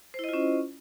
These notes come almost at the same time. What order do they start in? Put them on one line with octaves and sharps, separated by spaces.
C5 E4 D#5 F4 C#4